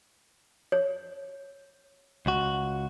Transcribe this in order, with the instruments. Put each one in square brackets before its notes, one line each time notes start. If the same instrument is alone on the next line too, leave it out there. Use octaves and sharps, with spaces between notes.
[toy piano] C#5
[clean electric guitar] C#2 F#4